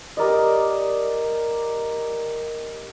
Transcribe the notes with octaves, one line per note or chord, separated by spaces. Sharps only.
G4 A#4 D5 D#5